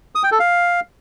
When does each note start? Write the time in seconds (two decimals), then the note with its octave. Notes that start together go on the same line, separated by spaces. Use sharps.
0.15 D#6
0.23 G5
0.31 A4
0.40 F5